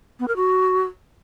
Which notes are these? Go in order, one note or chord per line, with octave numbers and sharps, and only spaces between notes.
B3
A#4
F#4